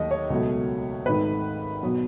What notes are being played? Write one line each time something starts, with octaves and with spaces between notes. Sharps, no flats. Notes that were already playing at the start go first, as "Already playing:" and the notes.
Already playing: D#2 D#3 F#3 A3 D#5
C#5
C#2 B2 F#3 A3
G#1 G#2 D#3 A3 B4
B2 F#3 B3